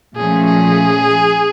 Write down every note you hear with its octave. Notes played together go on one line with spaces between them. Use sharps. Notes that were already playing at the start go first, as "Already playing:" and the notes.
A#2 F3 A3 C#4 G#4
G#4